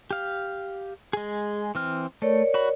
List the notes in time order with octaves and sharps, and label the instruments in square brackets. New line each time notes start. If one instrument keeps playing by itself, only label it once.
[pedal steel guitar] G4 F5
G#3 G#4
E3 C4 F6
[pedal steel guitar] A3 [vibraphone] A#4 C#5 D5
[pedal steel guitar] F#4 B5